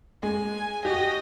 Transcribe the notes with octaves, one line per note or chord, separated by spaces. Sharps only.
G#3 G#5
F#4 G4 D#5